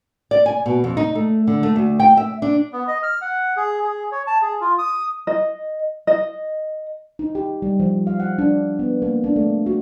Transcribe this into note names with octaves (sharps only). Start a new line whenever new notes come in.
D5
G#5
B2
F2
D#4
A3
D3
A3
D2
G5
E5
D4
B3
D#5
F6
F#5
G#4
G#4
C#5
A5
G#4
F4
D#6
D#5
D#5
D#4
G4
G3
F3
F5
F#5
D4
B3
A#3
D4
A3
F#4